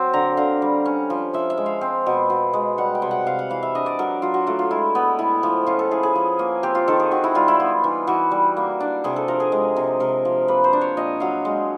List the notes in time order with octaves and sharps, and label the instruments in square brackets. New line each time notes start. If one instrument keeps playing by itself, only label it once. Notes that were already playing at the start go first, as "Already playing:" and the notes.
Already playing: [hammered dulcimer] F#3 C4
D3 A#5
D3 F5
G3
C#4
F3
F3 E5
E5
G#3
F5
C4
B2
B2
G#3
G3 F#5
G5
C3
F#5
C3 F5
F#5
E3 F5
E5
D4 D#5
D5
F#3 A#4
F#3 F4
F#4
A3 F4
F4
G#3 E4
B3
A2 E4
F3
C#4 F4
A4
E4 G#4
G#4
F3
A#3
C4 G4
F4
D#3 A4
G#4
D#3 F#4
E4
G3 F4
E4
B3 F4
E3
E3 F#4
G3
A#3
D4
C3 G#4
A4
F3 A#4
G#4
G#3
C3
C3 A#4
F3
A#3 B4
C5
D4
C#5
A#2 D#5
F#3 F5
G#3